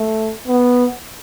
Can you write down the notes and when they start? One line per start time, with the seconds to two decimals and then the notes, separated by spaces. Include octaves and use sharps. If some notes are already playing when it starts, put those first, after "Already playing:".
Already playing: A3
0.48 B3